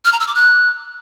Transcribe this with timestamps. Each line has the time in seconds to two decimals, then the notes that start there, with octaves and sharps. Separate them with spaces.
0.05 F6
0.12 A#5
0.20 E6
0.27 D6
0.35 F#6